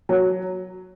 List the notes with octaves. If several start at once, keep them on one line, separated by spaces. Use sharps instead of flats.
F#3